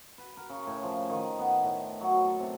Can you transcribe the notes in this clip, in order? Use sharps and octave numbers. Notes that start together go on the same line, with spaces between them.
B4
A#4
C#3
A2
F3
D#3
B3
A2
F#3
A4
C3